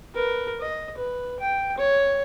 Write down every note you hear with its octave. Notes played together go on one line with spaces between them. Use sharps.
A#4 B4
D#5
B4
G5
C#5